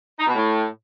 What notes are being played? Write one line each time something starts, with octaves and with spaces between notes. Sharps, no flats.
D#4
B2
A2